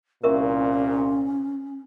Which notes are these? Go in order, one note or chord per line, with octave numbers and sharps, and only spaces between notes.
C2 A#2 C#4 A#4 E5 C#6